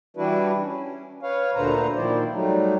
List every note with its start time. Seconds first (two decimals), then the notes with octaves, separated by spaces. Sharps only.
0.17 E3 G3 D4 E4 F#4 B4
0.63 C#4
1.23 B4 C#5 F5
1.56 D2 A#2 D3 B4 C5 A#5
1.96 A#2 D#3 F3 E4 C5 D5
2.33 F#3 G3 A3 D#4